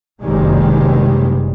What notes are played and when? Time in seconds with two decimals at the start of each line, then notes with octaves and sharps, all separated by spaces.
0.22 F#1 B1 C3 D#3 G3 G#3